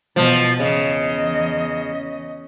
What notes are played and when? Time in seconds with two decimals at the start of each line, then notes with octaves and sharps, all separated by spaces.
0.16 B2 E3 F3
0.60 E2 C#3 D#5